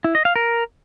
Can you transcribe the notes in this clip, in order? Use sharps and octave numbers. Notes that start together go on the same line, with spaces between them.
E4
D#5
F5
A#4